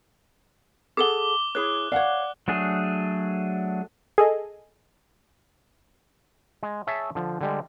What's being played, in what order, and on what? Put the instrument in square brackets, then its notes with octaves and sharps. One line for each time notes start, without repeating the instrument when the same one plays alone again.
[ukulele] G#4 A4 F#5 [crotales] D6 G7
[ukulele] E4 G#4 C#5 [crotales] F#6
[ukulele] C#5 F5 [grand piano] D5 F#5
[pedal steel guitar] F#3 A3 D4 G#4
[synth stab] G#4 A4 D#5
[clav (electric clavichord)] G#3
G#4 C#5 E5 A5
D3 F3
D3 G3 G#3